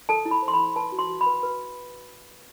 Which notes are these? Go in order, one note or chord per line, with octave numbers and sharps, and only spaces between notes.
A4 A5
E4
B5
C5
C6
B5
E4
B4 A5
F#4
C6
F#4
B5
B4
B4